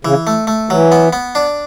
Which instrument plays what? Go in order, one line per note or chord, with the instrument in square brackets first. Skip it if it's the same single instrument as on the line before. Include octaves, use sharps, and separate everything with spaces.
[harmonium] C#3 [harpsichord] E3
[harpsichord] A3
A3
[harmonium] E3 [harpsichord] F#3
[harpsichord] B3
B3
D4